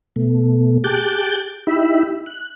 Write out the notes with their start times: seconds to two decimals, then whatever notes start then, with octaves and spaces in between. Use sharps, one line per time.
0.16 B2 A3
0.84 G4 G#4 A5 D6 F#6 G6
1.67 D#4 E4 G4 E5 B5
2.26 F#6